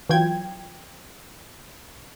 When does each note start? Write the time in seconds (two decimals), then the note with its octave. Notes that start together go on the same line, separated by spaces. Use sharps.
0.09 E3 F#3 F4 G5 G#6